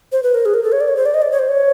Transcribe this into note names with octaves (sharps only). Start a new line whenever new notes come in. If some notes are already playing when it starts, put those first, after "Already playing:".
C5
B4
A#4
G#4
A#4
A4
C#5
D5
C#5
C5
D5
D#5
D5
C#5
C5
C#5